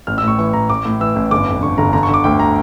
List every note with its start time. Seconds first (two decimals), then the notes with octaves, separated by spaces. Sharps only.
0.07 A1 F6
0.18 E6
0.23 A2 C#6
0.38 E3 C#6
0.53 A1 A#5
0.70 A1 D6
0.85 A2
1.00 E3 E6
1.16 A1
1.31 G1 D6
1.47 F2
1.63 D3 C#6
1.78 G1 A#5
1.93 D3 A#5
2.03 C#6
2.09 D3
2.14 D6
2.24 D2 G5
2.40 A#5